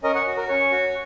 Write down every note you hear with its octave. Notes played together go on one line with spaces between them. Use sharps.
C#4 A#4 D#5
C#5 F#5
F#4
A#4
C#4 C#5
F#4